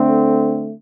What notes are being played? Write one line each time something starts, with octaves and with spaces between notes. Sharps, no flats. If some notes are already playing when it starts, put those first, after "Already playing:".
Already playing: D3 A3 C4